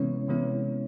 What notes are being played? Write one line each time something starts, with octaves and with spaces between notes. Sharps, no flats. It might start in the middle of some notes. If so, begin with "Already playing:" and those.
Already playing: C3 E3 G#3 B3 C#4 E4 C#5
C3 E3 G#3 B3 E4